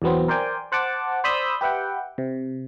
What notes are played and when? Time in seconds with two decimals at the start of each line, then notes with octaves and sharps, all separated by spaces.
0.02 E2 B2 F#3 B3 C4
0.28 A#4 C5 D5 G5 G#5
0.72 C5 F#5 A5 D6
1.24 C5 D5 B5 D#6 E6 G6
1.61 G4 B4 E5 F#5 G5
2.18 C3